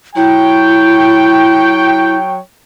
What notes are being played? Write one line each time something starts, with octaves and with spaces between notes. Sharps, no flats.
F#3 E4 C#5 G5